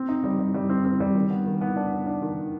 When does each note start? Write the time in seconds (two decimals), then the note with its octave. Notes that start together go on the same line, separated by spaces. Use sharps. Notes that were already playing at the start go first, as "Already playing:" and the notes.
Already playing: C4
0.08 D#4
0.24 G3
0.39 G3
0.54 G3
0.70 C4
0.85 C4
1.00 G3
1.15 D#3
1.30 B3
1.46 D#3
1.61 B3
1.76 D4
1.92 B3
2.06 D4
2.22 D#3